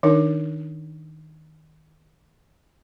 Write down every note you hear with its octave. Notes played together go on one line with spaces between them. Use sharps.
D#3 D4 D#4 A#4